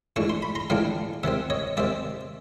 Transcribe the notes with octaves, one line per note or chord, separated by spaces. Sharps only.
A#1 G#2 E3 A3 D4 C#6
C6
B5
A#5 C6
A#1 G#2 E3 A3 D4 F5 G5
C3 D#3 G#3 C4 E5 F#5
C#5 D#5
C3 D#3 G#3 C4 D5 E5